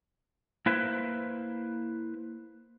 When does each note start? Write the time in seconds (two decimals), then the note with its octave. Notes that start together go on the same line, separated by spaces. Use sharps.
0.66 A#3 E4 B4 C5